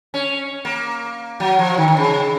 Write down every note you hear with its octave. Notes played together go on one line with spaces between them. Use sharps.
C#4
A#3
F#3
F3
D#3
D#3
C#3